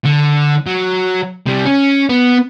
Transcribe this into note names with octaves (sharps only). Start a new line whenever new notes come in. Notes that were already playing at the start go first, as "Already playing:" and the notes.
D3
F#3
C3 G3
C#4
B3